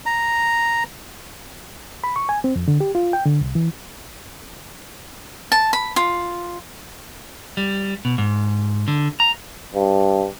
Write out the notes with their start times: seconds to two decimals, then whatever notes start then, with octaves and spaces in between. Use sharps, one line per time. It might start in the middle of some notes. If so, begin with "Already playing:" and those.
0.06 A#5
2.04 B5
2.16 C#6
2.29 G#5
2.44 C4
2.56 F2
2.68 D3
2.80 G4
2.95 F4
3.13 G5
3.26 D3
3.41 C2
3.55 E3
5.52 A5
5.73 B5
5.96 F4
7.57 G3
8.05 B2
8.18 G#2
8.88 D3
9.20 A#5
9.75 G2